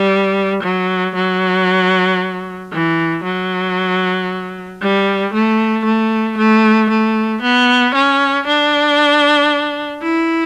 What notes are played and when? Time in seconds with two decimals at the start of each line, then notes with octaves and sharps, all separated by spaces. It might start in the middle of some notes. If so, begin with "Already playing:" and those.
Already playing: G3
0.63 F#3
1.16 F#3
2.72 E3
3.24 F#3
4.82 G3
5.34 A3
5.85 A3
6.38 A3
6.90 A3
7.42 B3
7.95 C#4
8.47 D4
10.03 E4